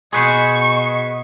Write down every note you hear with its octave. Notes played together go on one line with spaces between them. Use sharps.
B2 G#4 B4 C5 D#5 C#6